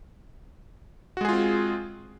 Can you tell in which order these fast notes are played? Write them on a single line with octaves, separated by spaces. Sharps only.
F#4 G#3 G#4 F4 C4